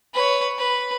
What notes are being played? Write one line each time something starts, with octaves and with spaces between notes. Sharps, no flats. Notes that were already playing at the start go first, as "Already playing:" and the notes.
B4 C#5
B4